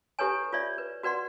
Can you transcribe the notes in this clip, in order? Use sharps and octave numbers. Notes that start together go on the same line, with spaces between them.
E4 G4 A4 B4 C#5 G#5
F4 C#5 D5 E5
B4
F#4 B4 D5 F#5 C6